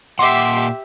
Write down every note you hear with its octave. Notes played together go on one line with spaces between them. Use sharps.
A#2 G4 E5 F#5 C6 D6